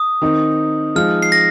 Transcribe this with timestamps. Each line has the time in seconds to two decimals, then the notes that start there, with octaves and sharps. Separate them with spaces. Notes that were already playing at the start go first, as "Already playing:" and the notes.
Already playing: D#6
0.22 D#3 C4 D#4
0.96 F3 G#3 D#4 F6
1.22 C7
1.32 A#6